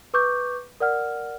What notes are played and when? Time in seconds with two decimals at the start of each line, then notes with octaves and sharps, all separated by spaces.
0.14 B4 C#6 D6 G6
0.80 A#4 D5 F#5 F6